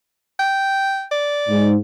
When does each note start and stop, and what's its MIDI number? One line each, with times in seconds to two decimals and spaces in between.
0.39 1.05 79
1.11 1.70 74
1.49 1.77 44